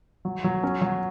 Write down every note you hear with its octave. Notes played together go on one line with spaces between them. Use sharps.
F#3
F#3
C#4
F#3